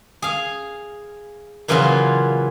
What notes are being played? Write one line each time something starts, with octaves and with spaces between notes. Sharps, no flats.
G#4 F5
A#2 C#3 E3 F#3 C#4 F4